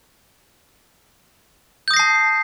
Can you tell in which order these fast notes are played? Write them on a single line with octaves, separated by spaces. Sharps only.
G6 D#6 A#6 C7 A5